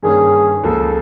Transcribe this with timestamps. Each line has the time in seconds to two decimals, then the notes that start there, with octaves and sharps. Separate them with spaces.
0.03 G2 D#3 G3 A#3 C#4 G#4
0.64 C#2 C#3 F3 A#3 A4